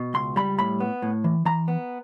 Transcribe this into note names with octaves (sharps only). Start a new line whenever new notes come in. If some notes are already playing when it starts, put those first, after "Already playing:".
Already playing: B2
C#2 C6
G3 B5
A2 B5
B3
A2
E3
E3 A#5
B3